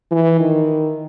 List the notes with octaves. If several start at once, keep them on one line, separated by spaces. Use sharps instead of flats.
E3
D#3